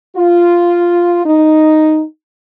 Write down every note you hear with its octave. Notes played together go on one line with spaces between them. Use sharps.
F4
D#4